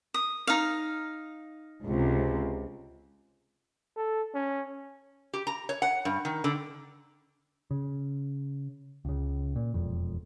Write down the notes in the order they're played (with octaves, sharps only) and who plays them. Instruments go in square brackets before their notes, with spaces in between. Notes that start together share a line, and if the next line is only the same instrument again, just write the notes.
[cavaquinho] D#6
D#4 F5
[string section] C#2 C3
[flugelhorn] A4
C#4
[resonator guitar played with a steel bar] G4
A#5
C#5
F#5
G2
D#3
D3
[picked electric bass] C#3
C#2 C#3
A#2
E1 F2